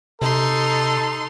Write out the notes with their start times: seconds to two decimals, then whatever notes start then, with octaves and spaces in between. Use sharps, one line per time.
0.22 C3 D#4 A4 C6